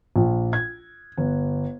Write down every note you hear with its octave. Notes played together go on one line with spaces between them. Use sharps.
A#1
G#6
G1